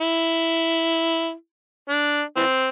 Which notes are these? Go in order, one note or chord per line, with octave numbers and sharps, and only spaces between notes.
E4
D4
E3 C4